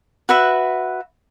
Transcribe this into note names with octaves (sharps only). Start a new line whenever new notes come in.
F#4 B4 E5